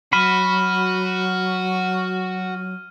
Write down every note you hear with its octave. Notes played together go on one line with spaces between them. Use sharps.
F#3 F#4 B5 F6 D#7